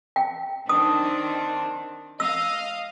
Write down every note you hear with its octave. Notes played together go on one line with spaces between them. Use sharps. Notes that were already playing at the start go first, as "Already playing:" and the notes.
G5
D#3 C4 D4 D#6
D#5 F5 E6